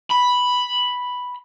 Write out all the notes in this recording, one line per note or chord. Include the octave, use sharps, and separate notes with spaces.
B5